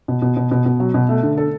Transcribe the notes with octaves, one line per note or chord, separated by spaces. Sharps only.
B2
B2
B2
B2
B2
F#3
B2
A3
D3
A4